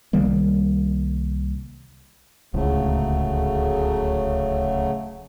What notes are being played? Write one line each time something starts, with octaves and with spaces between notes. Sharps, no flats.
C2 D#3 G3 A#3
D1 C#2 C#3 F#3 A3